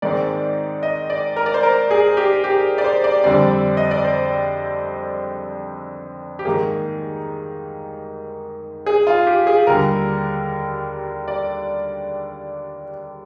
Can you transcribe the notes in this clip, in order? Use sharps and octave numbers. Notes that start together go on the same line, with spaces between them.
G#2 D#3 G#3 C4 D5
D#5
D5
A#4
D5
C5
A#4
G#4
G4
G4
D5
C5
D5
F2 D3 G3 C4 D5
D#5
D5
C5
G4
G#2 D#3 A#3 G#4
G#4
F4
G4
G#4
D#2 D3 G3 A#4
D5